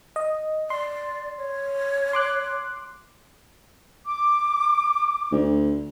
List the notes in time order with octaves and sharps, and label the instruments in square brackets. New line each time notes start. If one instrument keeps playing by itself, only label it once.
[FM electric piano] D#5
[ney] D5 [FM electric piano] C6
[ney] C#5
[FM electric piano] C6 D6 F#6
[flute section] D6
[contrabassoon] D2